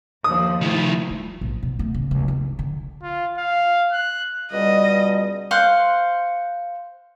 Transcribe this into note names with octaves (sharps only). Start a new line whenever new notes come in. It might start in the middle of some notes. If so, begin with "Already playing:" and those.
D#2 F3 D#6
D#3 F3 A3 E4
G3
A#1
B2
A3
C#3
C#2
D#4
D3
F4
F5
F#6
C#2 B2 G3 D#5
C5 F5 F#5 C6